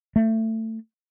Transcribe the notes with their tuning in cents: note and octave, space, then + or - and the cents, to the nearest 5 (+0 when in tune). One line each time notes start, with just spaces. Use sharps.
A3 +20